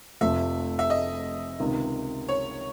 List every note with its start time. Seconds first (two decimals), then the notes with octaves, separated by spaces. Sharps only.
0.21 F1 F2 C3 F3 A3 E5
0.79 E5
0.90 D#5
1.60 C#2 C3 D#3
2.29 C#5